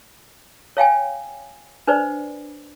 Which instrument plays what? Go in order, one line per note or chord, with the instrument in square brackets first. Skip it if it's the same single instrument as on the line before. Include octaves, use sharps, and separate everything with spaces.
[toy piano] C#5 F5 G5 G#5
D4 B4 C5 D5